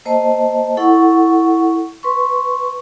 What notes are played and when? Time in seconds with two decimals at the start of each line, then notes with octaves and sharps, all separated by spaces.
0.05 A#3 C5 D#5 A5
0.77 E4 A4 F#5 C#6
2.03 B4 C6 C#6